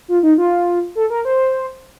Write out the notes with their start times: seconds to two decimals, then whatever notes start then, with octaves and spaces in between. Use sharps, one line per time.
0.08 F4
0.23 D#4
0.38 F4
0.95 A4
1.10 A#4
1.25 C5